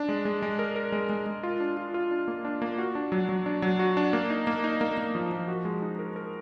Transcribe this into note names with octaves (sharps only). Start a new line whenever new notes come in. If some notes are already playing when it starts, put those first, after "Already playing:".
Already playing: D4
G#3
G#3
G#3
A#4
A#4
G#3
G#3
G#3
F4
D4
F4
F4
D4
A#3
D4
A#3
F#4
D4
F#3
F#3
D4
F#3
F#4
D4
A#3
D#4
A#3
D#4
A#3
A#3
F3
F3
F#4
G#3
D#4
A#4
A#4